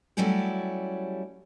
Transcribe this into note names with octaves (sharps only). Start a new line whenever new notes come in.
F#3 G3 A3 C#4 E4 G4